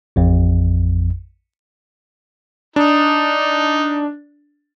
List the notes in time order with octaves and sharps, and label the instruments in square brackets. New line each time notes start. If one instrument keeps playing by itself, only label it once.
[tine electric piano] A1 F2
[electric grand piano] D4 [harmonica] D#4